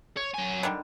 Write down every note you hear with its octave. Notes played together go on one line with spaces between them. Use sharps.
C#5
F#3 G#5
D3 D#3 G3